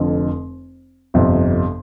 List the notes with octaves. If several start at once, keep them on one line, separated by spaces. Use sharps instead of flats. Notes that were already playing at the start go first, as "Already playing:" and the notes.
Already playing: F1 F2 D3
G1 F2 C3